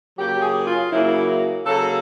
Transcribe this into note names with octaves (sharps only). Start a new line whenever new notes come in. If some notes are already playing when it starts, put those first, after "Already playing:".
C#3 F#3 A#3 G4
G#4
F4
C#3 F#3 A#3 E4
C#3 F#3 A#3 A4